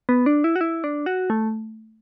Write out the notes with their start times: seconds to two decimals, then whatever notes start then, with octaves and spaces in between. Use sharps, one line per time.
0.09 B3
0.26 D4
0.44 E4
0.56 F#4
0.61 E4
0.84 D4
1.06 F#4
1.30 A3